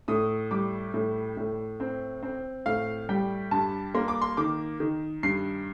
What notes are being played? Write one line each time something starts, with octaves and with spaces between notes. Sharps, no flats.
A2 D#6
G3 D6
A2
A2
C4
C4
A2 F5
G3 G5
G2 A5
A#3 C6
D6
C6
D#3 D6
D#3
G2 C7